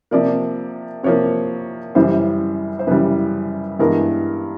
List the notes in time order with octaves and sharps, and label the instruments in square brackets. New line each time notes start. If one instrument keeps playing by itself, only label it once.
[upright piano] C3 F3 A#3 D5
C3 F3 A#3 C#5
F#2 C#3 E3 G3 C5
C5
F#2 C#3 E3 G3 B4
G2 E3 G#3 B3 A#4